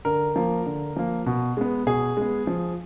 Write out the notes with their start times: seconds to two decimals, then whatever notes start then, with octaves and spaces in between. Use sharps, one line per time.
0.05 D3 A#4
0.36 F3 A#3
0.66 D3
0.97 F3 A#3
1.26 B2
1.57 G#3 B3
1.86 B2 G#4
2.17 G#3 B3
2.47 F3